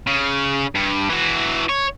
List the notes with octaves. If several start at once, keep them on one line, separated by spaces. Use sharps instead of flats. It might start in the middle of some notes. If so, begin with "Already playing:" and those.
C#3
G2
E3 F#4
C#5